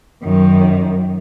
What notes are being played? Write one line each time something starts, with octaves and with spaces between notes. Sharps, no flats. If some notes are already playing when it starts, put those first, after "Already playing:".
F#2 D#3